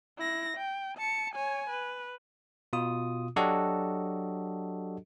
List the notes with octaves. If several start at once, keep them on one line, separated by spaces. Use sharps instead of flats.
E4 A#6
G5
A5 C#7
C#5 G#5
B4
B2 F4 D#6
F#3 D4 F#4 G4 A4 D#5